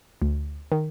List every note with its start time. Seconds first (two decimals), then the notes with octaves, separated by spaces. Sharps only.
0.22 D2
0.72 D#3